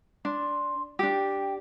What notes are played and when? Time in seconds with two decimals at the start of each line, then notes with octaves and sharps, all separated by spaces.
0.25 D4 C6
0.99 D4 G4 G5